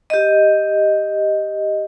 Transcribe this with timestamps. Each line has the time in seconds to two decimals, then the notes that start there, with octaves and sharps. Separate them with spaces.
0.10 G4 D#5